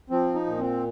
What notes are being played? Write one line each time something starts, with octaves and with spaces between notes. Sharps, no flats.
F3 C4
D#4
A#2
C4